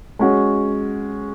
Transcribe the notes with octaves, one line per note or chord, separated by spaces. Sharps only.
G#3 C#4 F#4